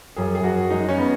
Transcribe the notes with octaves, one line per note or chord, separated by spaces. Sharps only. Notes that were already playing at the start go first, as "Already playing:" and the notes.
F#2 G#4
G#4
F#2 F#4
G#3 D#4
C#4
B3